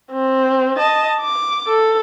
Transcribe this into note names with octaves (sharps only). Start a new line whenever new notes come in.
C4
D#5 A5
D6
A4